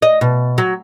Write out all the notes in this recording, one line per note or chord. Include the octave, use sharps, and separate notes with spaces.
D#5
B2
F#3